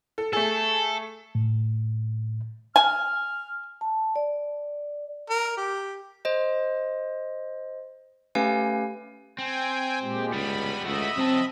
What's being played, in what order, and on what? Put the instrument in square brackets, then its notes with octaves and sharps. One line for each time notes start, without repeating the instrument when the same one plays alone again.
[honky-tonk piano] A4
[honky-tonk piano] A3 G#4 [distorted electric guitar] A4
[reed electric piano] A2
[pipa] G#5 [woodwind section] F6
[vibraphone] A5
D5
[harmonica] A#4
G4
[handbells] C5 D#5
A3 C#4 G4 B4 F5 G#5
[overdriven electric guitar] C4 [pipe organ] G5 G#5
[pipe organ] A#2 G#3 G4
[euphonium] C#2 [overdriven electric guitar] G3 B3 [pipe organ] B5
[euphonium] C#2 [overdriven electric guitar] A3 F#4 [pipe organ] D#5 E5 B5
[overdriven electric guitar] F#3 A5 [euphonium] C4